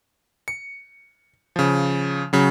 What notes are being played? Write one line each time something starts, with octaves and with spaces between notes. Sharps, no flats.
C#7
C#3 F3
C#3 F#3